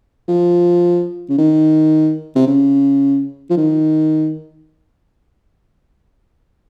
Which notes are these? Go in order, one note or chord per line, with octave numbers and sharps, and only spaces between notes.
F3
C#3
D#3
C3
C#3
F3
D#3